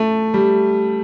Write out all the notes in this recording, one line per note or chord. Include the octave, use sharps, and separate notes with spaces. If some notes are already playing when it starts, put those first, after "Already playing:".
Already playing: A3
G3